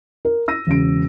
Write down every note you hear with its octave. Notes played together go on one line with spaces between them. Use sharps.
A#4
E6 A#6 D#7
E1 C#3 D7